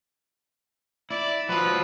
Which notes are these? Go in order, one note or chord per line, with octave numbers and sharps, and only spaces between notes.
E4 D5
F3 F#3 B4